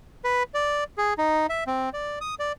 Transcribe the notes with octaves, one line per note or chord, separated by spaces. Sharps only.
B4
D5
G#4
D#4
E5
C4
D5
D#6
D5